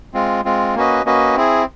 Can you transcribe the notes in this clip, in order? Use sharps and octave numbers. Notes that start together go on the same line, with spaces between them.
G#3 C4 F4
G#3 C4 F4
A#3 C#4 F#4 B4 D#5
A#3 C#4 F#4 B4 D#5
C4 E4 G#4